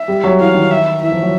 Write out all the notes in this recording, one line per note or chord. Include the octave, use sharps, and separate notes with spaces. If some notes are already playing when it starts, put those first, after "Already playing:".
Already playing: E5
G3
F#3
E3 F5
D#3
E5
E3 E5
F3
F#3